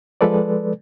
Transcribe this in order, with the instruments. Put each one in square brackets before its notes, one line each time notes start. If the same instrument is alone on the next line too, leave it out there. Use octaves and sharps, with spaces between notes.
[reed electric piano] F3 G#3 A4 B4 D5